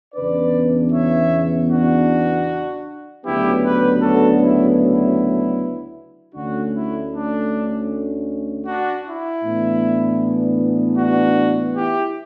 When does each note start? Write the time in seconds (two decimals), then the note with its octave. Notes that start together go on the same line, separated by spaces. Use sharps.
0.14 E2 C#3 E3 B3 D4 B4 D5
0.92 C#5 E5
1.70 D4 F#4
3.25 D2 C#3 F#3 B3 D4 E4 G4
3.63 G4 B4
4.02 F#4 A4
4.41 E4
4.79 E4
6.34 D2 D3 A3 C#4 D4 F#4
6.73 E4
7.12 D4
8.66 D4 F#4
9.05 E4
9.44 A2 E3 B3 D4
10.98 D4 F#4
11.76 E4 G4